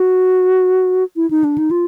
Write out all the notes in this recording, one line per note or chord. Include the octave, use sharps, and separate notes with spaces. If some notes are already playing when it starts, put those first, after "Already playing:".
Already playing: F#4
E4
D#4
D4
D#4
F4